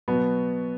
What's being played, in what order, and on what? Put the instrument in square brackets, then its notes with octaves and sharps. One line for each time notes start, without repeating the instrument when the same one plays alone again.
[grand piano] B2 F#3 B3